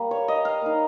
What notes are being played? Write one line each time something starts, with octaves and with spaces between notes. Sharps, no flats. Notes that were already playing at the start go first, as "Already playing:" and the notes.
Already playing: G3 A#3
C#5
D#5
F5
A#3 D#4